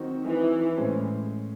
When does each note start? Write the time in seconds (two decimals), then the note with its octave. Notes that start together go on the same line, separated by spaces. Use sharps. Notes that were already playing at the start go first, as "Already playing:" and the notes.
Already playing: D#3 F#3 C4 D#4 F#4
0.27 E3
0.78 A2 G#3 C#4 G#4 C5